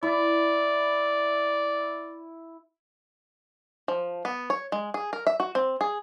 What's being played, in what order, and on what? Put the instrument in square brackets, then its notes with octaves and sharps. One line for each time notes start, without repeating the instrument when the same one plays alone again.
[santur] E4 [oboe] D5
[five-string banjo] F3
B3
C#5
G#3
G#4
A#4
E5
F#4
C4
G#4